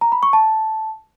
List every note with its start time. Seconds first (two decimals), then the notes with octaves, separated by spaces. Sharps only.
0.01 A#5
0.12 B5
0.23 C#6
0.33 A5